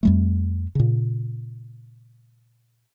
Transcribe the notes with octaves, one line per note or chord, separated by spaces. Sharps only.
F2 G3 A3
A#2 C#3